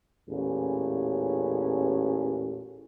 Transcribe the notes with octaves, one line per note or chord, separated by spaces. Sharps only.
A1 E2 A#2 C#4